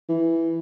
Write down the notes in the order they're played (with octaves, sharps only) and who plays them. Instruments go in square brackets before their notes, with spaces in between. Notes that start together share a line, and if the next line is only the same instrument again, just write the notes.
[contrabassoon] E3